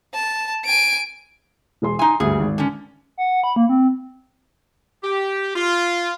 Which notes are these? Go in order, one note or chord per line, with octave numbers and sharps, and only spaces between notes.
A5
G#5 D7
E1 G#4 C6
D#4 G#5 C6 D#6
D2 G2 G#4
G#1
D3 C#4
F#5
B5
A#3
C4
G4
F4